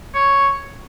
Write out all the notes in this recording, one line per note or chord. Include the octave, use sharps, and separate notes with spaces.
C#5